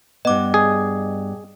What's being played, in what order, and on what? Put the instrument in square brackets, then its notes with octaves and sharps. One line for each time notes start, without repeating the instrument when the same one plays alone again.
[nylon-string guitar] G2 B3 [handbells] D#5 D6
[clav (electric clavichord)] G#4